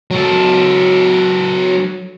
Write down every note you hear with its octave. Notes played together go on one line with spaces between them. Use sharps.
F#3 A4